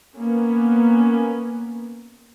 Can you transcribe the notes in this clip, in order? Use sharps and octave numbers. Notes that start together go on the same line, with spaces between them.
A#3 B3 C#4